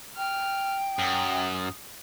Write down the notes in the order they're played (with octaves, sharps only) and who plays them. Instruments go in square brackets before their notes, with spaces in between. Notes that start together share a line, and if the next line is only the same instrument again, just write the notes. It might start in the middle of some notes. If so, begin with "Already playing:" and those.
[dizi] G5 [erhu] F6
[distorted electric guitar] F#2 [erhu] D#6